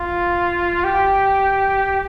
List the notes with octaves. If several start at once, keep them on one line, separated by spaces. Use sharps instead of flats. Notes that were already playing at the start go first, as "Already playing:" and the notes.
Already playing: F4
G4